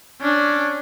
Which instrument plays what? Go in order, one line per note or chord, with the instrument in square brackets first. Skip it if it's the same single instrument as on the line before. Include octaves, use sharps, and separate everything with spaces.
[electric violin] C#4 D4